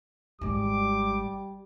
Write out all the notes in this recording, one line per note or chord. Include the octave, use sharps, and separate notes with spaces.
G#1 G3 G#3 D6